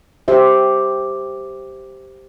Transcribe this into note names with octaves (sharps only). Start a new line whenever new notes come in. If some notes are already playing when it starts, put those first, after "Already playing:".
G4 C5 E5